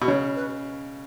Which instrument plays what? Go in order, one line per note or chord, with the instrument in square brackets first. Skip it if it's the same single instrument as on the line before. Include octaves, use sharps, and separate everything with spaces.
[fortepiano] B2 [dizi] D#5
[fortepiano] C#3 [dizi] C#5
[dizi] B4